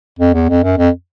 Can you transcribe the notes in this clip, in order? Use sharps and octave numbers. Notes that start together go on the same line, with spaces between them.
F2
E2
F2
F#2
F2